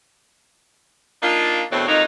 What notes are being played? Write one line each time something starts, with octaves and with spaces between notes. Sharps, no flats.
A#3 D4 D#4 F4
E2 B2 A3 C4 D4 C#5
F2 F#3 A#3 D#4